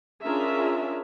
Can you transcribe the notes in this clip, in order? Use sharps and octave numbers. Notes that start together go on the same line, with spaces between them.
C#4 D4 F4 G#4 A#4 E5